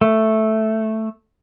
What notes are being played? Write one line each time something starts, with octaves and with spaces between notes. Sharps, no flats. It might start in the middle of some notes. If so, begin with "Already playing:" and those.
A3